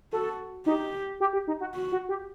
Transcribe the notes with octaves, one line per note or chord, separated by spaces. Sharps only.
F#4 A4
D#4 G4
G4
G4
D#4
F#4
F#4
F#4
G4